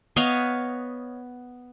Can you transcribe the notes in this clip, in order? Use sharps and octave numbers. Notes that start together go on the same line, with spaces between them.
B3 C#5 D#5 F5